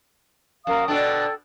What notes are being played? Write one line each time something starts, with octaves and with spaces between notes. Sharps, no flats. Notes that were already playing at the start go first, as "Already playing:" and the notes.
F#2 A#4 F5 D#6
B2 D4 A4 G5